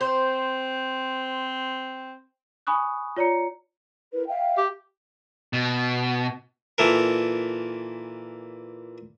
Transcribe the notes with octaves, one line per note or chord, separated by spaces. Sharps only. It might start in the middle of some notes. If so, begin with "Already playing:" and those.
C4 C5
G#5 B5 C#6 D#6 F#6
F4 C#5 D5 A#5 C#7
E4 A#4 B4
E5 F5 G5
G4
B2
A#2 E3 A4 A#4